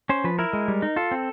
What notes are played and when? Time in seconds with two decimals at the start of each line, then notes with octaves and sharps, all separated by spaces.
0.09 C#4 C5
0.24 F3 B4
0.39 E4 A#4
0.53 G#3
0.68 G3
0.82 D#4
0.96 F4 A4
1.11 C4